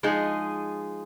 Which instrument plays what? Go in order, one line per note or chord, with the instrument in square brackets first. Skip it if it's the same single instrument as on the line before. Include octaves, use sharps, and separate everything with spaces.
[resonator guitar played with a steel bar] F3 G#3 D#4 G#4